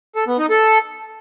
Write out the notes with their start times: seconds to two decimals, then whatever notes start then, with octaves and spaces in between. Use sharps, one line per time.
0.16 A4
0.27 B3
0.39 D#4
0.50 A4